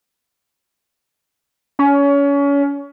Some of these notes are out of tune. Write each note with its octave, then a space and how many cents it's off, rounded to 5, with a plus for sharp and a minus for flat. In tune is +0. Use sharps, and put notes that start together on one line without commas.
C#4 +30